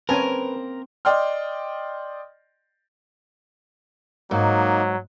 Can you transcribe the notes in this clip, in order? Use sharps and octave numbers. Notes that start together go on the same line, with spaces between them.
A#3 C4 C#4 A#4 B4 G#5 A5
D5 D#5 G5 C6 F6
G#2 F#3 A#3 D#4